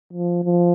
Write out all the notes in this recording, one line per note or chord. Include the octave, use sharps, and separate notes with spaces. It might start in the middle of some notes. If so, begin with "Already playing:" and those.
F3
F3